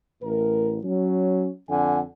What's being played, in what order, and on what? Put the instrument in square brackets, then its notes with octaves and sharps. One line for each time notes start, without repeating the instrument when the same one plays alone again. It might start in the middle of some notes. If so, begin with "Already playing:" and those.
[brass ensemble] A1 A2 A#4
F#3 C#4
F2 D3 F#5 G#5